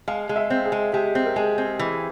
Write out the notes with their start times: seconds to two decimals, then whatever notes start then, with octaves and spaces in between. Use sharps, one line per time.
0.08 G#3 F5
0.29 G#3
0.36 E5
0.50 C4
0.66 G#4
0.72 G#3
0.93 G#3 G4
1.15 C4
1.26 A#4
1.36 G#3 G#4
1.58 C4
1.79 E3